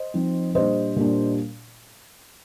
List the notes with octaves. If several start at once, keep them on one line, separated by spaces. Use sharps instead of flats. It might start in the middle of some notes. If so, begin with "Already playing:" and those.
Already playing: C5 D#5
F3 C4 D#4
A#2 G3 D4 C5 D#5
A#2 G3 D4